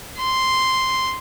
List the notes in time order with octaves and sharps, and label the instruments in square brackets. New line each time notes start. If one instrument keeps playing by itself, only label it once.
[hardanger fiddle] C6